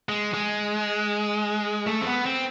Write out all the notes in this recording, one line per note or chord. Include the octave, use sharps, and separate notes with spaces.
G#3
G#3
A3
C4
B3
C4